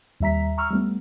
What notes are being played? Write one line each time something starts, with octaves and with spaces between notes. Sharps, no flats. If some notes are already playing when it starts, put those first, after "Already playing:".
D#2 G3 E5 A#5 B6
A#5 C#6 E6 F6
G3 A3 B3